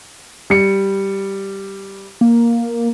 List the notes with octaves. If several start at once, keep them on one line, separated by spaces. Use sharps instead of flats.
G3 C#7
A#3